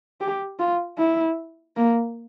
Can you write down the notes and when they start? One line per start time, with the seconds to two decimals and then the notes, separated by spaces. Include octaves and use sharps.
0.21 G4
0.59 F4
0.98 E4
1.77 A#3